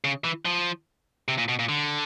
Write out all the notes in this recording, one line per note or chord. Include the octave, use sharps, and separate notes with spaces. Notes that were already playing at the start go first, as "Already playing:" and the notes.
C#3
E3
F3
C3
A#2
B2
A#2
D3